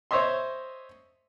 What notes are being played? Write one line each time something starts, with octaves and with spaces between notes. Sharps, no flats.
C5 C#5 D#5 E5 C6